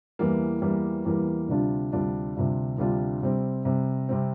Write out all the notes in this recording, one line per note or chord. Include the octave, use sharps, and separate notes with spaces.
E2 E3 G3 A#3
E2 E3 G3 A#3
E2 E3 G3 A#3
D2 C3 G3 D4 F4
D2 C3 G3 D4 F4
D2 C3 G3 D4 F4
D2 C3 G3 D4 F4
C3 G3 C4
C3 G3 C4
C3 G3 C4